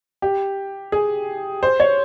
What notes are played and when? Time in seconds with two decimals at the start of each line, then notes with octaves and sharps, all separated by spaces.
0.22 G4
0.92 G#4
1.63 C5
1.80 C#5